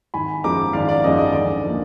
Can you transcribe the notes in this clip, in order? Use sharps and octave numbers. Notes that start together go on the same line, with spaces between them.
G#1 G#5 B5
F#2 F3 G#3 A#5 D6
G#1 D5 F5
D5
F#2 F3 G#3 D#5
D#5
D2 D5
D3 F3 A#3